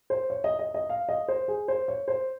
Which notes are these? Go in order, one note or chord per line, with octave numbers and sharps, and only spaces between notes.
C5
C#5
D#5
D#5
D#5
F5
D#5
C5
G#4
C5
C#5
C5